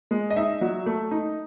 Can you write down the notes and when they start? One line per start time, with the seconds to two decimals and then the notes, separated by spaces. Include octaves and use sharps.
0.11 G#3
0.30 D#5
0.36 D#4 E5
0.61 F#3
0.86 A3
1.11 D#4